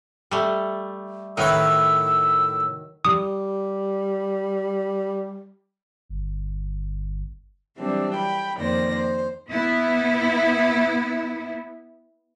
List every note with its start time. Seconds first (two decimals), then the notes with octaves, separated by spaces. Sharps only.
0.31 G3 A3
1.37 A2 D#3 F#3 B4 E6
3.05 G3 D#6
6.09 G1
7.77 E3 F#3 G3 C4 D4
8.16 G5 B5
8.57 F2 D#3 A#3 C5 D5 A#6
8.94 C5
9.50 B3 E4